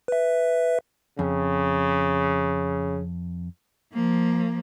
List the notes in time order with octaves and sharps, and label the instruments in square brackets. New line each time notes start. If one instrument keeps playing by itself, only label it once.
[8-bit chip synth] B4 E5
[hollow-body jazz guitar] F2 [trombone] C#3
[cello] F3 A#3